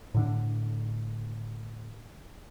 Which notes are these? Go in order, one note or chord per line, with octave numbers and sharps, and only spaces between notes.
A2 D3 D4